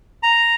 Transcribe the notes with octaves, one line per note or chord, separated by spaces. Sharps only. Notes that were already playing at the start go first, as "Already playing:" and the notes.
A#5